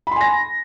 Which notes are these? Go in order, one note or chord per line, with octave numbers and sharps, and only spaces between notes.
G#5 B5 C6 A#6